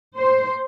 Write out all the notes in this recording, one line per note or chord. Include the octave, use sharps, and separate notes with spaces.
C5